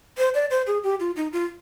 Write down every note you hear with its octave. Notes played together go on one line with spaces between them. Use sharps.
C5
D5
C5
G#4
G4
F4
D#4
F4